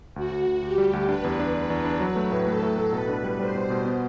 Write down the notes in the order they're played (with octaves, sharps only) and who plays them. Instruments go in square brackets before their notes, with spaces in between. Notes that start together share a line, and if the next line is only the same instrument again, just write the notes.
[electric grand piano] D2 [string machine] F#4
[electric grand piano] D2
D2
[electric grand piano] D2 [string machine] G4
[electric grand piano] G3
D2
[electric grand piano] D4 [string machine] B4
[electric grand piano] E2
D4
[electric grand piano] D4 [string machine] B4
[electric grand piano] E2
D4
F#3
A3
A2
[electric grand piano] A3 [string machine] A4
[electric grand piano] A2
A2
[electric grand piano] B2 [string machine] B4
[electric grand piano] D4
G3
[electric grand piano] G3 [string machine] C5
[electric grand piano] B2
B2
B3